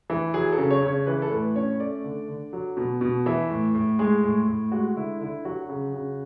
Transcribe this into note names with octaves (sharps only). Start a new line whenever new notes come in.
E3
F#3 G#4
A4
C#3
C#5
C#3
C#5
E3 B4
A4
A2 B4
C#4 C#5
A3 D5
D3
D3
F#3
B2
B2
E3 E5
A2
A2
G#3 G#4
A2
A2
G#3 F#4
D3 E4
D3 E4
F#3 F#4
C#3
C#3